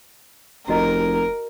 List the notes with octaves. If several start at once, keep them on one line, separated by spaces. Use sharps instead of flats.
F1 F#4 A#4 D#5 A#5